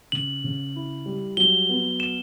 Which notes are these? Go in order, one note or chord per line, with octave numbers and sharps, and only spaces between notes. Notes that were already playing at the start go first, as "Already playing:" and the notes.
C#3 F#7
C#3
E4
G3
F#3 G7
B3
E7